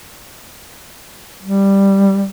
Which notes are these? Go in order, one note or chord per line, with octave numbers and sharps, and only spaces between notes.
G3